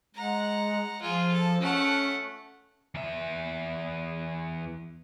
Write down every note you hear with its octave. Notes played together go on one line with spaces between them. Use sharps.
G#3 F#5 A#5
F3 F4 G#4
A4
A3 C#4 F#5
E2 E5